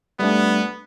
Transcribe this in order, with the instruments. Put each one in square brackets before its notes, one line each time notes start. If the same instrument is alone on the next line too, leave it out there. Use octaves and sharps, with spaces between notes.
[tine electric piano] G3 A3 D4 [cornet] B3